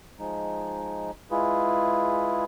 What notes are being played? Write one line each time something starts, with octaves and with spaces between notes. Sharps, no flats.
F3 G#3 D#4
G#3 E4 F4 G#4 B4